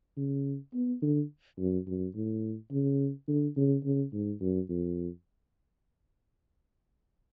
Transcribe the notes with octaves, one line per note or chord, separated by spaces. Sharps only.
C#3
B3
D3
F#2
F#2
A2
C#3
D3
C#3
C#3
G#2
F#2
F2